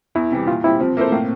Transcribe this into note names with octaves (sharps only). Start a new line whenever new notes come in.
E2 E4
C3 E3 G3
A#2 F4
G3 C4 E4
F3 C4
A#3 E4 A4 C5
A2 A#3